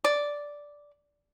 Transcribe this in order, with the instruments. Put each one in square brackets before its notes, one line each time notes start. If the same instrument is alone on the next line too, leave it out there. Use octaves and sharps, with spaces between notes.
[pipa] D5